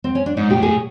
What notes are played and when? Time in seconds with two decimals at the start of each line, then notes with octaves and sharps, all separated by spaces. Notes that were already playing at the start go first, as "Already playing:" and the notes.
0.04 C4
0.15 C#4
0.26 D4
0.37 G#2 D#4
0.49 A#2 G4
0.56 A2
0.63 G#4